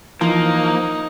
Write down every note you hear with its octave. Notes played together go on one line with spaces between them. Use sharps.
E3 F3 A#3 D#4